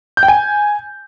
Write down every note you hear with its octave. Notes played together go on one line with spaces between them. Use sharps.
G6
G5
G#5